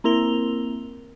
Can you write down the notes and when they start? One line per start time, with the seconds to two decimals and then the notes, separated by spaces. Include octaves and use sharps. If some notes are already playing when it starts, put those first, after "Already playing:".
0.04 A#3 C4 E4 A#4 F7 G7